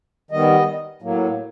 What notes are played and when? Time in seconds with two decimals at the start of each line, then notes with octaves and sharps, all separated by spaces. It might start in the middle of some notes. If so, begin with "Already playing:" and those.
0.31 D#3 G3 B3 D#5
1.02 A2 F#3 A#3